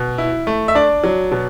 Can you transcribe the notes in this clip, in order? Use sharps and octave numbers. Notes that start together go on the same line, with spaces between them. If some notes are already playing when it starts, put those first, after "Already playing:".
Already playing: B2
E4
A3
E5
D4 D5
F#3
B2